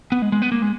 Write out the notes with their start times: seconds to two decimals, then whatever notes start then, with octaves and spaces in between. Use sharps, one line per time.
0.12 B3
0.22 G#3
0.32 G#3
0.42 B3
0.52 A#3
0.62 G#3